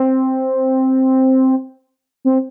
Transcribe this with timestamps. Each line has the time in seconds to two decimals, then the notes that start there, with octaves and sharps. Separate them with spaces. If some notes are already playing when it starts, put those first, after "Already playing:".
Already playing: C4
2.25 C4